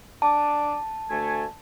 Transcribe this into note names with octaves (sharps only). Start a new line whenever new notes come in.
D4 A5 D6
D2 A3 G#5